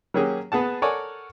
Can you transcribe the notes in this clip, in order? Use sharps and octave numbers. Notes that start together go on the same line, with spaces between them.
F#3 A#3 C#4 G4 G#4
B3 G#4 F#5 A5
A4 A#4 C#5 D5 F#5 G#5